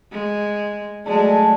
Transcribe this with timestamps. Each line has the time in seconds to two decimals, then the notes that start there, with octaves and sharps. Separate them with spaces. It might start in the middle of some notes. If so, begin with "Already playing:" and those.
0.12 G#3
1.06 F#3 G#3 A3 G#4 D5 A5